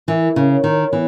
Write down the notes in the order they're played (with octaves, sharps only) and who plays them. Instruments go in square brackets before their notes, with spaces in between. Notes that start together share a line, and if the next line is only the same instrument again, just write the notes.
[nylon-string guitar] E3 [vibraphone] A#4
[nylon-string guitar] C#3
[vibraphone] C#5
[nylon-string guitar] D#3
[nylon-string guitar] E3 [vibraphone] B3